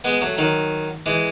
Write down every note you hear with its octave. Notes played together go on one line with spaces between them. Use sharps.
G#3 B3
F#3 A3
D#3 F#3
E3 G#3